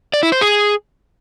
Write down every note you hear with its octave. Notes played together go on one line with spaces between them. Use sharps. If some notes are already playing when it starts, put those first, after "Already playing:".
D5
E4
C5
G#4